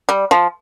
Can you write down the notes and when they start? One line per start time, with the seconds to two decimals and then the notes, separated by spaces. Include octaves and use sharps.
0.09 G3
0.31 F3